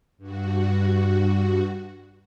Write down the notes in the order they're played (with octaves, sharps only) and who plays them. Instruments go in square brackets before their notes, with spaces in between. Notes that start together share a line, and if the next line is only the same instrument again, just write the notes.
[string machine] G2 F#4